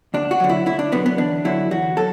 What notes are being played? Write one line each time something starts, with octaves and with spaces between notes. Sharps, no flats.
D2 D4
F#4
D3 F#3
E4
D2 E4
D4
D3 F#3 B3
B3
E2 D4
D3 F#3 E4
E2 F#4
F#3 A4